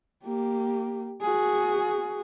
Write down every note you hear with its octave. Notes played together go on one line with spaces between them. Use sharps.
A#3 G4
F#4 G#4